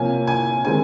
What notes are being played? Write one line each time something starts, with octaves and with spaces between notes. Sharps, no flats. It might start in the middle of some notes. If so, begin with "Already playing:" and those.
Already playing: C3 F3 A#3 C#4 G#5
G#5
D#3 G#3 C4 G#5